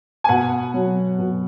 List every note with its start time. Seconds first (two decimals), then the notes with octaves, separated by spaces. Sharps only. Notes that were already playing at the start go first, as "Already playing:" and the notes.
0.24 G#5
0.29 B2 F#5
0.74 F#3
1.18 B2